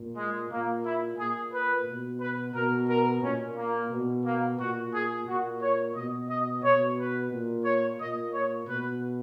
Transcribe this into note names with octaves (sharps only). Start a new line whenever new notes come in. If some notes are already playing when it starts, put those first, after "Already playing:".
Already playing: A#2
G#3
A#2 A#3
E4
A#2 G#4
B4
B2
B4
B2 A#4
A#4
A#2 C#4
A#3
B2
A#3
A#2 F#4
G#4
A#2 F#4
C#5
B2 D#5
D#5
B2 C#5
B4
A#2
C#5
A#2 D#5
C#5
B2 B4